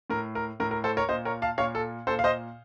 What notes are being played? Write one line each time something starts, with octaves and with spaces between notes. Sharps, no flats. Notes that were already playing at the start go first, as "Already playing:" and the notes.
A2 A#4
A#4
A2 A#4
A#4
A4 C5
A#4 C#5
A#2 C5 D#5
A#4 C#5
F5 A5
A#2 C#5 F5
A4
A#2 A4 C5
F5
C5 D#5